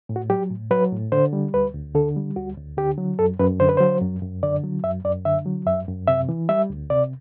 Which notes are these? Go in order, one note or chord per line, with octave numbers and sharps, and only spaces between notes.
A2
F#4
F#3 G4
A2
F#3 B4
A2
D3 C5
G3
D2 B4
D2
D3 A4
G3
D2 F#4
D2
D3 G4
F#3
F#2 A4
F#2 B4
D3 C5
B4
F#3 C5
F#2
F#2
D3 D5
F#3
F#2 E5
F#2 D5
D3 E5
F#3
F#2 E5
F#2
C3 E5
E3
G3 E5
D2
C3 D5